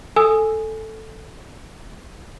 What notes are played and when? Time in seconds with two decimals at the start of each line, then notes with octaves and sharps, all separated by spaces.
0.16 A4 G#5 D#6 E6